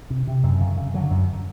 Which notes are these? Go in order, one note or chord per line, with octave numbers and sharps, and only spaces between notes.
C3
C3
F#2
C#3
C#3
D3 F#3
F#2